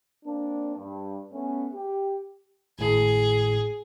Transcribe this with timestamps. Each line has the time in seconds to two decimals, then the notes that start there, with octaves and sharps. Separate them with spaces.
0.25 A#3 C4 D4
0.76 G2
1.32 A3 B3 C#4
1.74 G4
2.79 G#1 A2 G#4